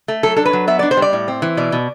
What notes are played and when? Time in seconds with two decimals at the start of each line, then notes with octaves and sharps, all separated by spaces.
0.08 A3
0.23 F#3 A4
0.36 D4 A4
0.46 B4
0.53 F#3
0.67 B3 E5
0.79 D4 D5
0.91 C5
0.97 G3
1.02 D5
1.13 A2
1.28 C4
1.42 E3
1.57 B2 D5
1.72 B2